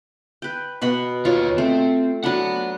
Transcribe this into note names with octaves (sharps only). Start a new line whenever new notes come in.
B4 G5
B2 F#4 B5
D#2 F4 C#5
A3 C4
F#3 D4 F#5 B5